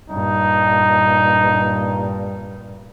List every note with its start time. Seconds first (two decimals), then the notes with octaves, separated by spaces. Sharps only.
0.10 G2 A#2 D#4